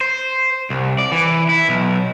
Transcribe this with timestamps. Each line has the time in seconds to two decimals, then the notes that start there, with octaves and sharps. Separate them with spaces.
0.01 C5
0.70 C2
0.99 D5
1.12 E3
1.49 E4
1.69 B1